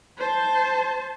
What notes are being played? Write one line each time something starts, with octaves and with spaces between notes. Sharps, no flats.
C5 A5